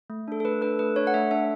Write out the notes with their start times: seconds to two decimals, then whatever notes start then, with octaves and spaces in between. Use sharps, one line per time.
0.10 A3
0.28 D4 A4
0.40 A4
0.45 A3 B4
0.62 D4 A4 B4
0.79 A3 B4
0.96 D4 A4 C#5
1.07 F#5
1.14 A3 E5
1.31 D4 A4 E5